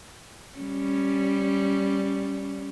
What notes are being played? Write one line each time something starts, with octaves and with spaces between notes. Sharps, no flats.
G3 C#4